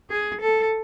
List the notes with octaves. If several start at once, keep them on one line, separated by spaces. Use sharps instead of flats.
G#4
A4